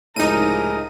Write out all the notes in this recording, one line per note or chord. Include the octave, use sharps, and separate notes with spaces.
C#2 A2 C3 F3 D#4 G#4 A#4 D#7